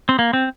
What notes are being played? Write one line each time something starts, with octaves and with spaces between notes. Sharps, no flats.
C4
A#3
C4